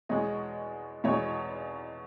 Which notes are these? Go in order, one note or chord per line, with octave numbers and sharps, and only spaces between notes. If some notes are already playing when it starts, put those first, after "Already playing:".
E2 B2 G#3 C#5 D#5
E2 B2 G#3 C#5 D#5